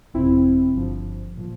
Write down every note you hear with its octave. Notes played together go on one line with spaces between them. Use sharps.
G1 F2 C3 C4 E4
G1 G2 F3
A#2 F3